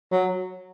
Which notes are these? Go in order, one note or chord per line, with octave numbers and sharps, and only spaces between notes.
F#3